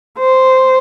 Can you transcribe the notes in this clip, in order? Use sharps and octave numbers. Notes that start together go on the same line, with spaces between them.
C5